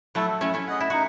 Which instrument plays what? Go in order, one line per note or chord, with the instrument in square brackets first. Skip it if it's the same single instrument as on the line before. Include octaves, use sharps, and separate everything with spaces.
[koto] F#3 A3 [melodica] E4 A4
[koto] A3 C#4 [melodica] E4
[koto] C#4 E4
[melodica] G#4 D#5 F#5
[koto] E4
[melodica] D#4 [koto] F#4